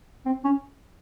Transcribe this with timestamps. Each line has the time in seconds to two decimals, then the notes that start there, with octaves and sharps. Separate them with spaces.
0.25 C4
0.44 C#4